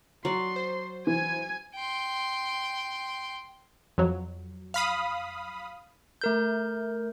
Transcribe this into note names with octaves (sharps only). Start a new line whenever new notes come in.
F#3 D5 C6
C5
E3 G#5 G#6
G5 C6
F2 F#3
F5 B5 D#6
A3 A#4 G6